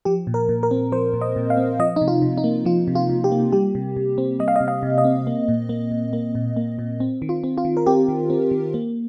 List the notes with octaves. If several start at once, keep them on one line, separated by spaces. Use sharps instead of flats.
F3 G4
A#2
A#4
A#2
A#4
C4
F3 C5
A#2
D#5
A#2
F5
C4
F3 D#5
D#4
C3
F4
C3
D#4
A#3
F3 F4
C3
F4
C3
G4
A#3
G3 G4
C3
C3
C4
G3 D#5
F5
D#5
C3
F5
C3
D#5
C4
A#3
A#2
A#3
A#2
A#3
A#2
A#3
A#2
C4
D#3
F4
C4
F4
D#3
A#4
C4 G4
D#3
C4
D#3
A#3